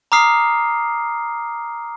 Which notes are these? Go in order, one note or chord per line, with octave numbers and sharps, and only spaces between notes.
A#5 D6 D#6 F6 C7